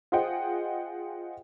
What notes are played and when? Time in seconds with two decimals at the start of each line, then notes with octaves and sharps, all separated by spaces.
0.12 F4 G#4 C5 D#5 F#5 G5